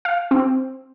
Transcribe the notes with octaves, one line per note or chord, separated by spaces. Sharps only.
F5
C4